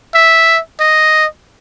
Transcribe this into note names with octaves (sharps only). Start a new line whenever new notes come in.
E5
D#5